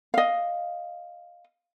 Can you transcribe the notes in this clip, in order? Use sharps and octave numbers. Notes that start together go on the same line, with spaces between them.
D#5 F5